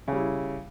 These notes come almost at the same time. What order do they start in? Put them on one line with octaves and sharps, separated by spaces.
C#3 G3 E4